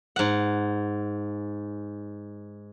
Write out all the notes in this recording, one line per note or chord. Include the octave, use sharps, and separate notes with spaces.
G#2 F#5